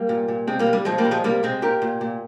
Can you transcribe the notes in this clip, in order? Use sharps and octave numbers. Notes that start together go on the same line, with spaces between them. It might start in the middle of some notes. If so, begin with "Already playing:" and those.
Already playing: G3 A#3
A#2
A#2
C3 G#3 C4
G3 A#3
C3
G3
A#2 F3 G#3
G3 A#3
A#2
F3 G#3
C3 G3 A#3
C3 G#3 C4
A#2 G4 A#4
A#2
A#2